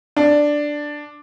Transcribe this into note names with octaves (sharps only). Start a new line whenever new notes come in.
D4